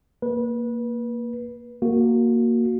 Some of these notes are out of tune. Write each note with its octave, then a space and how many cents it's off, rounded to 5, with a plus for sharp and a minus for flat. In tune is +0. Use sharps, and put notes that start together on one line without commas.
A#3 +0 B4 -25
A#3 +0 F#4 -5